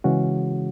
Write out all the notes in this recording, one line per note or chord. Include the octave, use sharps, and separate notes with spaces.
C#3 E3 G#3 C#4 F#4